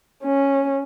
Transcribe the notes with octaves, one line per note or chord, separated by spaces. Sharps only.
C#4